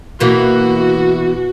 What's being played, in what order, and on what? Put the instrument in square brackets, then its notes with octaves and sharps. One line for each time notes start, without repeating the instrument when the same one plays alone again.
[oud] B2 E3 A#3 [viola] F#4